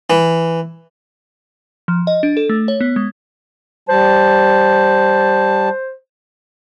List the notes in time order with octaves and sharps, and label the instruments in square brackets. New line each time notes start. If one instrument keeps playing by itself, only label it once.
[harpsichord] E3
[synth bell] F3
D#5
D4
A4
A3
C#5
B3
G#3
[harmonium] G3 A5 [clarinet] C5